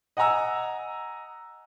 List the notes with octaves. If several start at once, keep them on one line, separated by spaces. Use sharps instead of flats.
D#5 F#5 G#5 A#5 E6